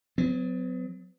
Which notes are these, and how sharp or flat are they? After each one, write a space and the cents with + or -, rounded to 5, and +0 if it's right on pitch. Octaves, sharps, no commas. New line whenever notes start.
F#3 -15 B3 +40